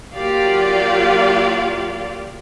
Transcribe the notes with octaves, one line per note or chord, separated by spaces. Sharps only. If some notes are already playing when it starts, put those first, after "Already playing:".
F#3 A#3 F4 G4 D5 F5